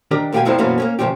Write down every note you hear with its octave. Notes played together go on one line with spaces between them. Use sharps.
D#3 D4 G4 A#4
D#2 B2 G4 F5 G5 G#5
F2 C3 F3 G3 D#4 E4
F#2 B2 E3 F3 A#3 B3
A#3 B3 C#4
E2 G#2 C#3 F3 G4